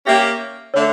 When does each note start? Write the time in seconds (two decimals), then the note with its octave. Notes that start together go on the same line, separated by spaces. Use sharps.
0.06 A#3 C#4 G4 E5
0.74 D3 A3 C#5